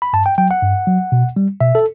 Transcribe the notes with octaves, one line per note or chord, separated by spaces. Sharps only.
B5
G2 A5
G5
F#3 G5
F#5
G2
F#3
B2
G3
B2 E5
A4